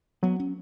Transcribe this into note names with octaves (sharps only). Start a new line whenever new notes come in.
F#3 B3
C#4